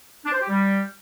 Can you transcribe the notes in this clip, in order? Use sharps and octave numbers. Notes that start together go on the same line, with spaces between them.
D4
C5
G4
G3